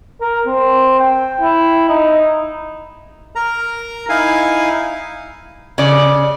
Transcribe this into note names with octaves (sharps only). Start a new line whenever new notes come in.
A#4
C4
G5
E4
D#4
A#4 A#5
D#4 E4 F5 G#5
C#3 D5